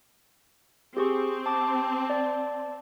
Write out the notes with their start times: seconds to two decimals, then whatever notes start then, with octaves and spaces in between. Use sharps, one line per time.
0.97 C4 G4 G#4 C#6
1.46 A5 D6
2.10 D5 A5